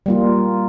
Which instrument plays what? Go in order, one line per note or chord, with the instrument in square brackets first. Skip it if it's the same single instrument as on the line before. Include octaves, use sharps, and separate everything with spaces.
[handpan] G3 A#3 F4